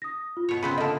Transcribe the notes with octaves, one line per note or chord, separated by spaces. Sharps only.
D#6 A#6
F4
B2 C#5
C#3 B3 C4 B5
D3 A#3 D#5 A5